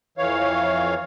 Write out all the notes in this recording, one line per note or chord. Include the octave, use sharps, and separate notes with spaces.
F2 E3 C#5 F5